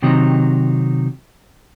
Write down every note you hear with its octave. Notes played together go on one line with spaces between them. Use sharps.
C3 D#3 F#3 C4 D#4